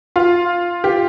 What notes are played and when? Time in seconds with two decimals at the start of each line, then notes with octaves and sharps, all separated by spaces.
0.16 F4
0.84 G4